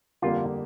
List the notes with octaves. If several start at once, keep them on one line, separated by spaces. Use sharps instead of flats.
G1 F2 D3 A#3 F4 G4